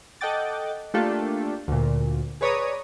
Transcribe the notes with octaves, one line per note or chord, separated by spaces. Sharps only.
A4 D#5 F#5 G5 D6 A6
A3 A#3 D4 F4 G4 A4
D2 A#2
G#4 B4 C#5 D5 A#5 D#6